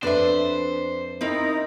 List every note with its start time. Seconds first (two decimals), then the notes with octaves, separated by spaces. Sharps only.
0.03 F2 C4 D4 B4 C5 E5
1.21 C4 D#4 E4 A#4 D#5